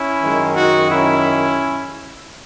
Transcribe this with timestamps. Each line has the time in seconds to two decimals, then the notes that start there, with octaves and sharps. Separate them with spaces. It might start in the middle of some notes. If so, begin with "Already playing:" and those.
Already playing: C#4 E4
0.21 F#2 D#3 G#3
0.56 D#4 F#4
0.91 C#4 E4